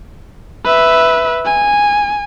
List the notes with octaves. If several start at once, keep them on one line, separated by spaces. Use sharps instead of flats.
B4 E5
G#5